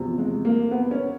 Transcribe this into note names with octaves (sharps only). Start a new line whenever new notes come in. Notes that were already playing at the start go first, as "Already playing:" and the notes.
Already playing: E2 C3 F3
G#3
A#3
B3
C#4